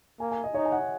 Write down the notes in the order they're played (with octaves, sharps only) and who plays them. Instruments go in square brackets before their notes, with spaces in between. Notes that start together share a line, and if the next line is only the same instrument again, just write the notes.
[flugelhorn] A#3 [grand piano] G#5
[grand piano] G#5
D#5
[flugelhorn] D#4 [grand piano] C#5
[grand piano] G#5
F#5